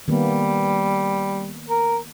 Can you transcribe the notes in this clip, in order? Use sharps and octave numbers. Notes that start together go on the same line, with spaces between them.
D#3 G3 A#3 B3
A#4